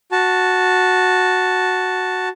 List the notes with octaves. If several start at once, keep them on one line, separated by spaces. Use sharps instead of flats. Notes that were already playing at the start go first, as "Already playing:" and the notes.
F#4 A5